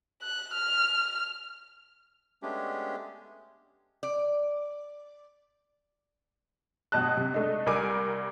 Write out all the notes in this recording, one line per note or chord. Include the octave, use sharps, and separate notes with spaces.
F#6
F6
G#3 A3 B3 C#4 D4 G4
D5
G1 B2 D#5 A5 F#6
C3
G#3 A3 D4 D#4
C2 G3 A#4 G#5 D6 D7